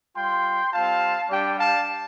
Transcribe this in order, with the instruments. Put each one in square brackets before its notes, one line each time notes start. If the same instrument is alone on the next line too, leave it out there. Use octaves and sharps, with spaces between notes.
[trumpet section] G3 F4 G5 C6
G3 C4 F4 F5 A5
G3 D4 G4 D5 G5
F5 A5